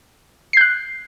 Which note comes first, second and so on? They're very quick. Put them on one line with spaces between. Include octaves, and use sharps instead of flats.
C7 G6 F#6